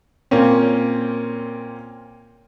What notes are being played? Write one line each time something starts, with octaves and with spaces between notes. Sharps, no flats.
A#2 A#3 C4 C#4